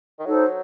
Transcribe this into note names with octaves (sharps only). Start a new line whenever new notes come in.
D#3
F#3 D#4 A4 C5